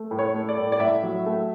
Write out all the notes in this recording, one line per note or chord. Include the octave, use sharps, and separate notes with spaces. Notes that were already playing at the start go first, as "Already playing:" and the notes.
Already playing: A3
A2
C#5
A3
D5
A2
D5
A2 E5
F#3
A3